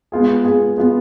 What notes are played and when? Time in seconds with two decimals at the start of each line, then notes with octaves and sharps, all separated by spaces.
0.12 G#3 B3 F4 G#4
0.44 G#3 B3 F4 G#4
0.77 G#3 B3 F4 G#4